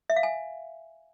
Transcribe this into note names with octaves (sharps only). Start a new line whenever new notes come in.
E5
F5
G#5